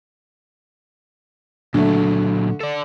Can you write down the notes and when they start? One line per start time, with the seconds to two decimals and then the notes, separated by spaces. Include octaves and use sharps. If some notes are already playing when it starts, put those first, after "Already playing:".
1.74 A#2 D3 F#3 A3
2.61 A4 D5